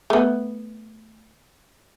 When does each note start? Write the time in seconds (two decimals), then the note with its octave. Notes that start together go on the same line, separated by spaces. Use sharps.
0.10 A3 B3